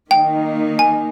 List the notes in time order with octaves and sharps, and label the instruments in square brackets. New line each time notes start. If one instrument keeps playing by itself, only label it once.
[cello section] D#3 A#3 D#4 [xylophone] G5
[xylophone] G#5